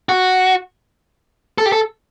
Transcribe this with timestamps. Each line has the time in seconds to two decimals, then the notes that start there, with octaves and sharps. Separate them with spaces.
0.09 F#4
1.58 A4
1.66 G4
1.72 A4